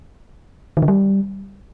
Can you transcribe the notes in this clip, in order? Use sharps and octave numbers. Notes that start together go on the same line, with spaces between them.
D#3
D3
G3